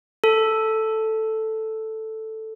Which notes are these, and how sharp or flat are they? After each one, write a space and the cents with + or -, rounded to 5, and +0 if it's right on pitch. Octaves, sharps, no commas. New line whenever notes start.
A4 +0